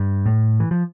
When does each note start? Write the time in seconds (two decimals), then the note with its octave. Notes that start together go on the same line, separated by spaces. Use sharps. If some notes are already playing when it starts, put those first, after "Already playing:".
Already playing: G2
0.26 A2
0.60 E3
0.71 F3